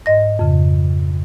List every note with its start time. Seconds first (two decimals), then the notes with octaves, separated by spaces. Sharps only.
0.06 G#2 D#5 A#6
0.39 F2 C#3